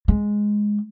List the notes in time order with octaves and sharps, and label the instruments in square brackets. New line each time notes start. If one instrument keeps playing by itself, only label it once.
[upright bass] G#3